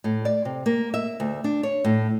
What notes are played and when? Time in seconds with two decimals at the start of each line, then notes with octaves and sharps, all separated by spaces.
0.04 A2
0.25 D5
0.45 C3
0.66 A#3
0.94 E5
1.20 D2
1.44 D4
1.63 C#5
1.85 A2